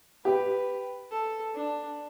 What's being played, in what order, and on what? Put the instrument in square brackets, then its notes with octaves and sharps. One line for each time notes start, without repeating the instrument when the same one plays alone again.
[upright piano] G4 [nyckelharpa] B4
[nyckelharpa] A4
D4